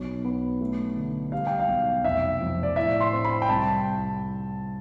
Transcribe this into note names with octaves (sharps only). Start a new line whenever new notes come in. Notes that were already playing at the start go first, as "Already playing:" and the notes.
Already playing: B1
B3
A3
D3
G3 F5
G5
F5
B1
F1 E5
F2
D5
A2 E5
C6
C4
B5
G5
C2 A5